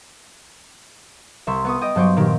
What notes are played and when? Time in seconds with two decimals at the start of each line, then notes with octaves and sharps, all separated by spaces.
1.47 C2 E5 C6 C#6
1.65 B3 C#6 D#6
1.81 D#5 G5 D#6
1.95 G2 F#3 C5 C#6 D6
2.17 A#2 D#3 G4